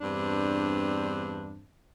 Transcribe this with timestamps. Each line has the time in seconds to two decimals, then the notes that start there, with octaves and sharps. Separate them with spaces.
0.01 E2 G2 C4 D4